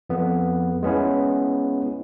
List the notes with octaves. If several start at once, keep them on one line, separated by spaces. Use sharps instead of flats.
F2 B3
G#3 B3 C#4 E4